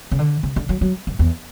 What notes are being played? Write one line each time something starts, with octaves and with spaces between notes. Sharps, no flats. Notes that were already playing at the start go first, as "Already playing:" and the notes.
C#3
D3
C#3
D3
F#3
F#3
F#2
E2